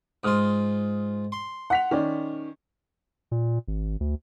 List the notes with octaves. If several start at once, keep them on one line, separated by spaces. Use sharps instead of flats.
G#2 F4 D#6 F6
C6
F#5 B6 F7
D#3 C#4 D5
A#2
G#1
D2